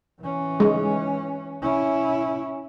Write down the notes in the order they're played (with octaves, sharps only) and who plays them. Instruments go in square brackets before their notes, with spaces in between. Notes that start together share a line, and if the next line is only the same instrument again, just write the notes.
[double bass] E3 C#4
[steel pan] G#3
[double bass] C#4 E4